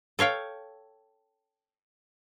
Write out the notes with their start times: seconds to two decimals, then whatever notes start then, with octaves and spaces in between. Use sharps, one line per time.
0.19 A4 C#5 F5 G5